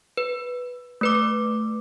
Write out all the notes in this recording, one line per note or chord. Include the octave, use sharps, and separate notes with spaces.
B4
A3 B4 D6